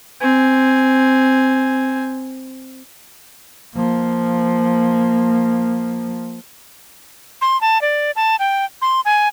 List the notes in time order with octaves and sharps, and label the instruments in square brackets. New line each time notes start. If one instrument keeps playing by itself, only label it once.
[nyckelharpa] C4 G#5
[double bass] F3 A#3
[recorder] C6
A5
D5
A5
G5
C6
G#5